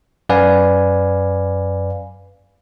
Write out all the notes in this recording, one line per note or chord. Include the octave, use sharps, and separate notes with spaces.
F#2 B4 D5 F5 G#5